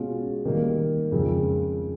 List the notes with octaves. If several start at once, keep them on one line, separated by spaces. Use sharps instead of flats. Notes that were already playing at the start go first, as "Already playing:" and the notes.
Already playing: B2 G#3 C#4 F4
D#3 G3 A#3
F2 C#3 F3 G#3